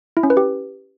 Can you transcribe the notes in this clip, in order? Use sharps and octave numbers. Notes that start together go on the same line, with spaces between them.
E4
C#4
B4
G4